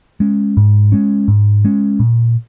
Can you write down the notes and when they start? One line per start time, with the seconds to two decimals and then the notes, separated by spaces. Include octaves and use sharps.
0.20 G#3 C#4
0.57 G#2
0.92 G#3 C#4
1.28 G#2
1.65 G#3 C#4
2.00 A#2